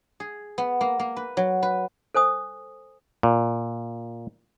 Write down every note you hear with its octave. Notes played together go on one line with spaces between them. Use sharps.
G#4
B3
A#3
A#3
B4
F#3
B4
A4 C5 G#5 D#6
A#2